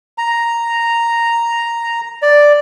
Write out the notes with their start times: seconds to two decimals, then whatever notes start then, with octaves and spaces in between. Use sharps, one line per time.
0.18 A#5
2.22 D5